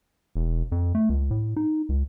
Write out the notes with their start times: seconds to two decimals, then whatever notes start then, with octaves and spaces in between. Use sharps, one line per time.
0.35 E1
0.72 F2
0.95 A3
1.09 C#2
1.31 A2
1.56 D#4
1.89 C#2